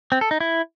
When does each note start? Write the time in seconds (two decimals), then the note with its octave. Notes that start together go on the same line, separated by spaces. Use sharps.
0.12 C4
0.21 A4
0.31 D#4
0.41 E4